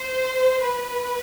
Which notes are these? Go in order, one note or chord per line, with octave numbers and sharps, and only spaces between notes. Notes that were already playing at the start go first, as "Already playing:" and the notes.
Already playing: C5
B4